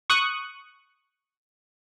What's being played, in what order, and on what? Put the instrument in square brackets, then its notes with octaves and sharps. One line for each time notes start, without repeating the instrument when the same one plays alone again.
[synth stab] C#6 D#6 F#6